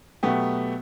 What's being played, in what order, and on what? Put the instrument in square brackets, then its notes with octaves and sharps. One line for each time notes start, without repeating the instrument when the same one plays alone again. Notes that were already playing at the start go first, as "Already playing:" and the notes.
[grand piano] B2 F#3 A3 B3 G4